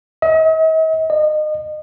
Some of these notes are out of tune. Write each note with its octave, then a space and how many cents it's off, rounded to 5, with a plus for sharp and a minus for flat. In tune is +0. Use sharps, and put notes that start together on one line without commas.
D#5 +45
D#5 -30